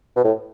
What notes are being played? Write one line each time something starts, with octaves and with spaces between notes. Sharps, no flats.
B2
A2